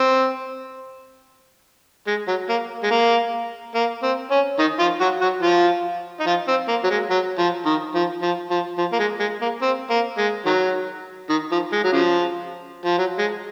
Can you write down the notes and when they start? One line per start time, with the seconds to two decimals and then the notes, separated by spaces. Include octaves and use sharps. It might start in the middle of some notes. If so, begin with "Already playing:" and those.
Already playing: C4
2.07 G#3
2.28 F#3
2.49 A#3
2.83 G#3
2.91 A#3
3.75 A#3
4.03 C4
4.31 C#4
4.59 D#3 D#4
4.79 F3 F4
5.01 F#3 F#4
5.21 F#3 F#4
5.42 F3 F4
6.20 D#4
6.26 F3 F4
6.48 C4
6.68 A#3
6.84 F#3
6.90 G#3
7.10 F#3
7.38 F3
7.66 D#3
7.95 F3
8.22 F3
8.51 F3
8.78 F3
8.92 A#3
8.99 G#3
9.20 G#3
9.41 A#3
9.62 C4
9.90 A#3
10.18 G#3
10.45 D#3 F#3
11.29 D#3
11.51 F3
11.72 G#3
11.84 F#3
11.93 C#3 F3
12.85 F3
12.98 F#3
13.18 G#3